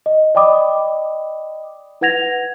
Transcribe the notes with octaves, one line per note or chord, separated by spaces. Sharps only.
D#5
D5 D#5 G5 B5 D6 D#6
E4 B4 F#5 G#6 A#6 F7